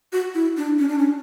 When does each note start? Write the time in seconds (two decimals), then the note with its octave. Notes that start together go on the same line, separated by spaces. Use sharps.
0.13 F#4
0.34 E4
0.57 D4
0.79 C#4
0.88 D4
0.98 C#4